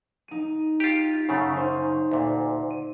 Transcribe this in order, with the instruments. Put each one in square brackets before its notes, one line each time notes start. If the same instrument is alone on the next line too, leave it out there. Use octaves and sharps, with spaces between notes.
[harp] D#4 D#7
[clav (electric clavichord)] F4 G4
F#2 C#3 A3
[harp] D#4 C5
[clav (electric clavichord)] D2 A#2
[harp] D#7